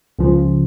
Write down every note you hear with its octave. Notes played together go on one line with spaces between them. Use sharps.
C#2 C#3 F3